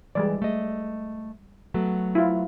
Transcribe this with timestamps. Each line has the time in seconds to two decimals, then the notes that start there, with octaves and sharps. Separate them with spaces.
0.15 E3 G3 G#3 D5
0.42 A3 D#5
1.74 F#3 A3 B3
2.15 E4 F4